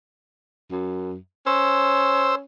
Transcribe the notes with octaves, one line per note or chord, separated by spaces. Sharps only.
F#2
C#4 C5 E6